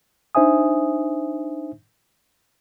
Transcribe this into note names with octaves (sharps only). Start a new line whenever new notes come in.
D4 D#4 C5 E5 G#5 D#6